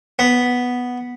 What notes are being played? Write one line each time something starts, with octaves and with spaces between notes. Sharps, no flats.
B3